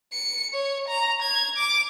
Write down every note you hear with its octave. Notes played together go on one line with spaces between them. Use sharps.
C#7
C#5
A#5
G#6
D6